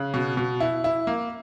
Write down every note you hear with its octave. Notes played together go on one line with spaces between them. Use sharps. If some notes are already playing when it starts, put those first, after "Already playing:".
Already playing: C#3 F#6
B2
B2
E4
E4
A#3